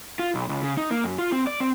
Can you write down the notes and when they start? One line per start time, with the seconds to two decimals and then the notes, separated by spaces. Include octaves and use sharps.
0.19 F4
0.35 B1
0.49 C#2
0.63 C#3
0.77 D#4
0.91 A#3
1.04 F#2
1.18 F4
1.32 C4
1.47 D5
1.60 C4